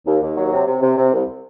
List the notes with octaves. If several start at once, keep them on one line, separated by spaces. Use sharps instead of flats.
D#2
D#2
F#3
C3
C3
C3
C3
C2